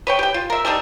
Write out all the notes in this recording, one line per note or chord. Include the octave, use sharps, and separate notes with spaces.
B4 C#5 G5
G4 G5
F4
A#4 E5
G3 A3 D4 D#4